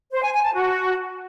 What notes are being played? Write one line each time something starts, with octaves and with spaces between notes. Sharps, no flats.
C5
G#5
G#5
A5
F#4